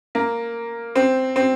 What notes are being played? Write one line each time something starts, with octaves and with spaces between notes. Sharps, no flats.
A#3
C4
C4